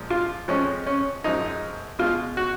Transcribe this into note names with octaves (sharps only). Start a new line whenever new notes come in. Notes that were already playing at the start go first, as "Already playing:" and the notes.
Already playing: A#2 F3 G#3
F4
F2 F3 G#3 C#4
C#4
F#2 F3 G#3 D#4
B2 G#3 F4
F#4